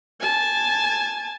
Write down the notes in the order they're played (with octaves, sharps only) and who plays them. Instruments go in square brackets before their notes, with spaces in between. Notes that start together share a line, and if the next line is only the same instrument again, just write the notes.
[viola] G#5 A5